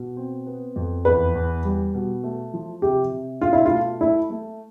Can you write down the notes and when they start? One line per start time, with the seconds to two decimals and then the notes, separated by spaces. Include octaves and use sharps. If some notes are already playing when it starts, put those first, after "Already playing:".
Already playing: B2
0.17 C4
0.46 B3
0.76 F2
1.05 E2 B4
1.35 E2
1.64 G3
1.94 B2
2.23 A3
2.54 F3
2.82 C3 G4
3.12 C3
3.41 B2 F4
3.53 E4
3.66 F4
3.71 A3
4.01 A3 E4
4.30 A3